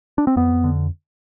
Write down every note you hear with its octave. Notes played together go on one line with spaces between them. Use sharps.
D4
C4
F2 B3
D3